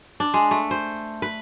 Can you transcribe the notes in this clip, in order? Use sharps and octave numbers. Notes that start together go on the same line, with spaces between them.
D4
G#3
A3
C5
B4